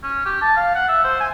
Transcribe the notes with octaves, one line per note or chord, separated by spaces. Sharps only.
C#4
G4
A5
F5
F#5
E5
C5
G#5